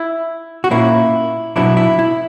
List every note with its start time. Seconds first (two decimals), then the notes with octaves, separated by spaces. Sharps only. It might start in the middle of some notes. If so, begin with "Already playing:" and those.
Already playing: E4
0.64 F#4
0.71 A#2 A#3 C#4 E4
1.56 B2 F#3 B3 D4 E4
1.77 E4
1.99 E4